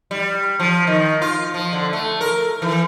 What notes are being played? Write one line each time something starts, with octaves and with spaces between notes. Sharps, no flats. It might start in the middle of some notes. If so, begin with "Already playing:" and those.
G3
F3
D#3
F4
F3
D3
A3
A#4
E3